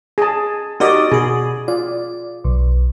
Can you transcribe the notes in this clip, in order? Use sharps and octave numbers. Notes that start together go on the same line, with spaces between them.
G#4 A5
D#4 F#4 G4 A#4 D5 D#5
B2 F#4 G#4
F4 D5
B1